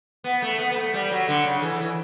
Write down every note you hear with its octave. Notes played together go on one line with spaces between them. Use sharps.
B3
A3
B3
B3
A3
G3
F#3
D3
C#3
E3
E3